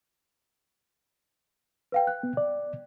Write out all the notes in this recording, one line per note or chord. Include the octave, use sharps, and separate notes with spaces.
B4 F5 G5
F#6
B3
D5